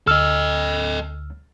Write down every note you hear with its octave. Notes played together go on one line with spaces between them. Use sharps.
D2 A4 D#5 E6 F6